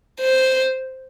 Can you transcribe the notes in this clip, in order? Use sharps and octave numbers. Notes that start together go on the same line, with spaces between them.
C5